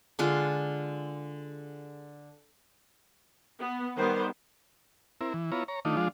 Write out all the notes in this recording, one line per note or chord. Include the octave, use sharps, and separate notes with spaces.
D3 G#3 F4
B3
D#3 G3 B3 C5
C4 E4 A#4
E3
B3 E4 F4 C#5 A#5
C#5 A#5
D#3 A3 D4 D#4 F4
F3 G#3 D4 F4